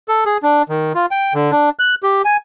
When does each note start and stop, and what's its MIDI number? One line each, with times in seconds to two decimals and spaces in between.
0.08 0.24 69
0.26 0.37 68
0.43 0.62 62
0.69 0.92 51
0.95 1.06 65
1.11 1.33 79
1.34 1.51 50
1.52 1.70 62
1.79 1.95 90
2.03 2.22 67
2.25 2.37 80